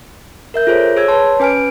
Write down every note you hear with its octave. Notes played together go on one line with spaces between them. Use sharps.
A#4 E5 G6
F4 G#4 A4 C5 C#5
G#4 C#5 E6 G#6
B4 C#5 A5 C6
C#4 B4 G#5 F6 D7